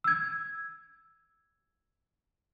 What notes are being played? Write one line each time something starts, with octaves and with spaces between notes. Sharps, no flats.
E6 G#6